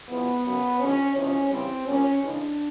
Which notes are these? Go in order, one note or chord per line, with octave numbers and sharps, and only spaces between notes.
E2 C3 F3 G#3 B3
F#2 C#3 F#3
F2 D3 G3 C#4
E2 C3 F3 G#3 C#4
E2 C#3 E3 G3 C4
A#2 G3 C#4
D#2 C#3 E3 G#3 D4